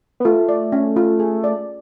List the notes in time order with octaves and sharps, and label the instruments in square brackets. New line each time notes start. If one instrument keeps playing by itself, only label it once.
[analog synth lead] B3
[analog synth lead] A3 [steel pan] F4
[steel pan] D5
C#4
F4
G#4
D5